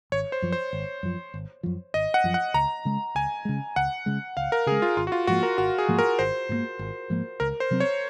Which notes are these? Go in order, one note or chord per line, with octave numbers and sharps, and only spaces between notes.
G#1 C#5
C5
F#2 F3
C5
G#1
F#2 F3
G#1
F#2 F3
G#1 D#5
F#5
F#2 F3
F#5
C#2 A#5
C#3 G#3
C#2 G#5
C#3 G#3
C#2 F#5
C#3 G#3
C#2 F5
A#4
C#3 G#3 G#4
F4
G#1 F4
F#4
F4
G#2 F3 A#3 F#4
A#4
G#1 F#4
G#4
G#2 F3 A#3
A#4
G#1 C5
G#2 F3 A#3
G#1
G#2 F3 A#3
C#2 A#4
C5
C3 F#3 C4
C#5